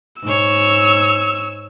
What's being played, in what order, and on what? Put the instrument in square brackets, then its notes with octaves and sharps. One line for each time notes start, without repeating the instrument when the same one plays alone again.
[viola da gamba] G#2 C#5 [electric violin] E6